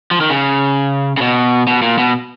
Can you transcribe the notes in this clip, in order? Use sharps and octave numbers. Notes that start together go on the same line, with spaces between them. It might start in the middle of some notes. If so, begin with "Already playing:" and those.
F3
D#3
C#3
C#3
B2
B2
A#2
B2